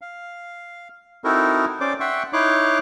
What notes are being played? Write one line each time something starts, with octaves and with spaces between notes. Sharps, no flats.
F5
C4 D#4 E4 F#4 A4 A#4
C#4 C5 D5 D6
E5 F#5 G5 C6 C#6
D#4 E4 C#5 C6 D6 F#6